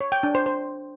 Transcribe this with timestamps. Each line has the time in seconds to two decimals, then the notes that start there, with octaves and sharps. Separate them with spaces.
0.01 C#5
0.12 G5
0.23 D4
0.35 C5
0.46 C5